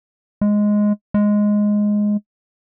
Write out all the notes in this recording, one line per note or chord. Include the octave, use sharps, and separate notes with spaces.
G#3
G#3